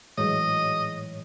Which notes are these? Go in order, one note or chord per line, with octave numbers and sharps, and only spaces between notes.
A2 E3 F#3 G#3 C#5 D#5